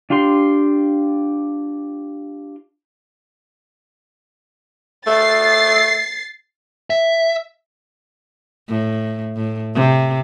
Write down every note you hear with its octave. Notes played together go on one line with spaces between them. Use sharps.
D4 F4 G4 C6
A3 A6 C7
E5
A2
A2
C3